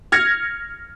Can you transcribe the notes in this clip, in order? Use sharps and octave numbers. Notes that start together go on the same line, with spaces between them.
F6 G#6 A#6 C#7